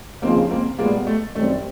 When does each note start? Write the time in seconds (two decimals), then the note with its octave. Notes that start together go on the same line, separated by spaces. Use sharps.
0.22 D#2 C#3 F3 A#3 C4
0.51 A#3 C4
0.78 A#2 G3 G#3 A#3 B3
1.07 A3
1.35 F#2 D#3 G3 A3 C4